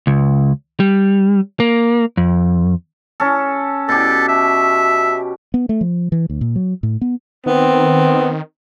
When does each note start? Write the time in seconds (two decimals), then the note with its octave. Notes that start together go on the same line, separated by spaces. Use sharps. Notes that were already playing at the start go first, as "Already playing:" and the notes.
0.07 C#2
0.80 G3
1.60 A#3
2.17 F2
3.20 C#4 A4
3.89 B2 G4 A4
4.29 E5
5.54 B3
5.69 A3
5.81 F3
6.12 E3
6.30 D2
6.41 A#2
6.56 F#3
6.83 A2
7.01 B3
7.46 D#3 B3 C4